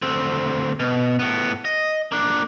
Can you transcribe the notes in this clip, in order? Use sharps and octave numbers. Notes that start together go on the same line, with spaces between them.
D2 C4
B2
A2 B3
D#5
A#3 D4